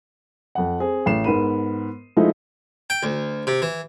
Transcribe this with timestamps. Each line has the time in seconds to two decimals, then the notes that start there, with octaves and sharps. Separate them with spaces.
0.55 F2 F#5
0.80 C4 G#4
1.06 A1 C7 E7
1.24 G#2 B3 A#4 B5 D#7
2.17 F3 G#3 A3 D#4 E4
2.90 G5
3.03 D2
3.47 C3
3.62 E3